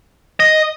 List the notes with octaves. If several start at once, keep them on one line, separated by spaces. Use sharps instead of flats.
D#5